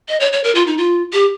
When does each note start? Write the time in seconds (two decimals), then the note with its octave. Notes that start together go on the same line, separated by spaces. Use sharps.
0.09 D#5
0.20 C#5
0.33 C#5
0.44 A#4
0.55 F4
0.67 D#4
0.78 F4
1.13 G4